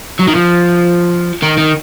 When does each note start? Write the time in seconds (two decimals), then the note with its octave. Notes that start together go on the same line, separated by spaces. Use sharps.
0.20 F#3
0.28 D#3
0.35 F3
1.42 D#3
1.58 D#3